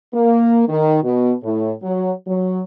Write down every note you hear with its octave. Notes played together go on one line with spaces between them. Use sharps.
A#3
D#3
B2
A2
F#3
F#3